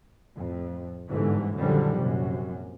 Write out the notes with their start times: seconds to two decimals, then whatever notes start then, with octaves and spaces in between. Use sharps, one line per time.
0.36 F2 A2
1.09 G1 G#2 D3 E3
1.54 A#1 F#2 D3 D#3 F3 G3
1.99 A#1 F#2 C3